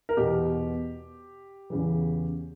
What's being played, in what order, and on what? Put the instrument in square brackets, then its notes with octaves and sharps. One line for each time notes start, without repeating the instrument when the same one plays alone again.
[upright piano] A#4
E2 B2 G4
E2 C#3 E3